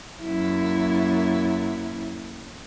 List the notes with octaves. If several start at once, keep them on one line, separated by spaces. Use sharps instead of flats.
F#2 A#3 E4